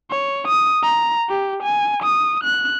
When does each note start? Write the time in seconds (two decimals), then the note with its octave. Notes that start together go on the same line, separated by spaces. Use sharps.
0.11 C#5
0.47 D#6
0.83 A#5
1.29 G4
1.63 G#5
2.03 D#6
2.44 F#6